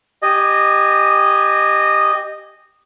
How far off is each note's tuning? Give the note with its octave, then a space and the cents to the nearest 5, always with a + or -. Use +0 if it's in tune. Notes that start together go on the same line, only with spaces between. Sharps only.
G4 +0 D#5 -15 G#5 +0